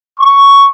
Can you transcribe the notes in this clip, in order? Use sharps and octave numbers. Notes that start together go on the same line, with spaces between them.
C#6